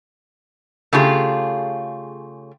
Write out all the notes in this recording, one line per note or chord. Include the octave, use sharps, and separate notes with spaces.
C#3 A3 F4 G4 G#4